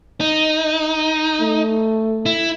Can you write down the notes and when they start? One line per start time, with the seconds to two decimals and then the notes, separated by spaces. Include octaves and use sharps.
0.20 D#4
1.41 A3
2.26 E4